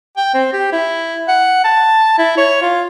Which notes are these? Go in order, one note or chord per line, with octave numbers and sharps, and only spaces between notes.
G5
C4
G4
E4
F#5
A5
E4
C#5
F4